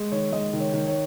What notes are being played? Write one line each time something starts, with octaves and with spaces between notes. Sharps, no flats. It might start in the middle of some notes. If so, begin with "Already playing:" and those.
Already playing: G#3
D#3 C#5
G#3 D#5
D#3
C#5
D#3
C#5